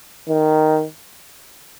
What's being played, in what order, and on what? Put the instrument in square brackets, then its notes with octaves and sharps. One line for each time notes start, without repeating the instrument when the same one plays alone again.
[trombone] D#3